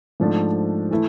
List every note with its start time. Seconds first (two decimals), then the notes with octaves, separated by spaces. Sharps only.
0.20 G#2 F3 A3 D4 A4
0.91 E3 A3 E4